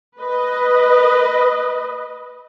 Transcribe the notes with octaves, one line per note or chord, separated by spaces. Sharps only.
B4 D#5